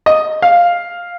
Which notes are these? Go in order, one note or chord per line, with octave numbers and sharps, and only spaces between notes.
D#5
F5